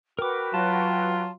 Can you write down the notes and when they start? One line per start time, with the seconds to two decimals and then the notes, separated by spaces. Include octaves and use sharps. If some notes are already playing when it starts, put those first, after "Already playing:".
0.19 F#4 A#4 B4 G5 D6
0.54 F#3 F4 A5